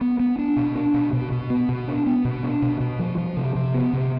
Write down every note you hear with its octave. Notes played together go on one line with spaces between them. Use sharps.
B3
B3
D4
B2
D4
B2
B2
B2
B3
B2
D4
B3
B2
D4
B2
B2
F3
F3
C3
C3
B3
C3